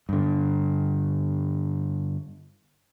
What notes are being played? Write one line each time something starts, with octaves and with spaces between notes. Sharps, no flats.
G2 D3